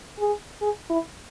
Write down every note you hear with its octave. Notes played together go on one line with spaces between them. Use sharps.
G#4
G#4
E4